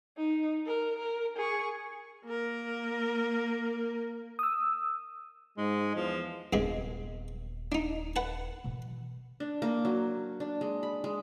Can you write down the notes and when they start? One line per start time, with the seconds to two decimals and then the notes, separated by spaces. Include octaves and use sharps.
0.17 D#4
0.66 A#4
0.99 A#4
1.37 G#4 C#6
2.25 A#3 A#4
4.39 D#6 E6
5.58 G#2 G#3
5.96 E2 F3
6.53 D#1 G2 C3 G#3 B3
7.72 D4 D#4
8.16 B4 F#5 A5
8.64 B2 E3
9.40 D4
9.62 A#3
9.85 F#3
10.40 D4
10.61 G#3
10.83 B5
11.04 G#3